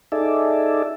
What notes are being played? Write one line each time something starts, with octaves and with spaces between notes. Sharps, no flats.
D#4 G#4 A4 D5 E5